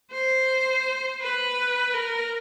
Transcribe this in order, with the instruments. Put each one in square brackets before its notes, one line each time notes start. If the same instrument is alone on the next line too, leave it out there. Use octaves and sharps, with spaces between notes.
[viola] C5
B4
A#4